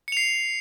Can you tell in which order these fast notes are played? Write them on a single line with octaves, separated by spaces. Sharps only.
C#7 F7 C7